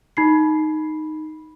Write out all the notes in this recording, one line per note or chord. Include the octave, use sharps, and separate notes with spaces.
D#4 B5 C7